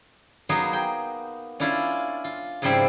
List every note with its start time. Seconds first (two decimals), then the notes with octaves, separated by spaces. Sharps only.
0.49 F#3 A#3 B3 D#4 G#4
0.73 G5
1.60 C#4 D4 E4 F4
2.24 F4
2.62 G#2 C#3 F3 G3 C4 E4